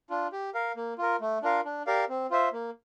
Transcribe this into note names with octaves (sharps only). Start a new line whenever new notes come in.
D4 F4
G4
A#4 F5
A#3
F4 A#4
A3
D4 F4 A#4 F5
D4
G4 A#4 D5 F5
C4
F4 C5 E5
A#3